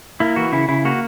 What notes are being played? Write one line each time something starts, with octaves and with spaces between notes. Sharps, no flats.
A#3 E4
E3 F#4
C#3 E4
C#3 E4
A#3 F#4